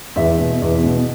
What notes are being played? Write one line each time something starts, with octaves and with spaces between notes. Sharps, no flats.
E2 E5
B2
E2
B2